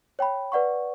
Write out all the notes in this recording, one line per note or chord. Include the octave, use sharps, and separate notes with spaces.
C#5 G5 B5
B4 D5 F#5 C#6